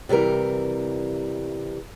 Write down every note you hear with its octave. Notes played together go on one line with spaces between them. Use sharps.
C3 E3 G3 A#4